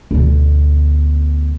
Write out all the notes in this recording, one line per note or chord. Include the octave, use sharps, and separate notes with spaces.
D2 B2